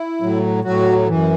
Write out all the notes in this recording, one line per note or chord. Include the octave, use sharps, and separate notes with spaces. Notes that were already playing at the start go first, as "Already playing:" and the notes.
Already playing: E4
A2 F#3
A2 F#3 F#4
F#2 E3